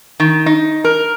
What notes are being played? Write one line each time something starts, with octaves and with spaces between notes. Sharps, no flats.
D#3
D#4
A#4